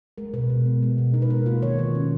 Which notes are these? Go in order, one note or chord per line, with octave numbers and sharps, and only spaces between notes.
G#3 A#4
B2 B4
B2
B3
G#3
B2
D#4 A#4
B4
B3 A#4
A#3 F4
D#3 C#5
D#3
C#4